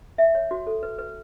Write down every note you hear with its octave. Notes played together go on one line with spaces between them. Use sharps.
E5
C#5
F#4
A4
B4
B4